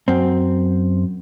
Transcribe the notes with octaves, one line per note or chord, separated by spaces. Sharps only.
F#2 C4